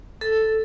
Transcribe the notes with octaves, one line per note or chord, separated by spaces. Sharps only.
A4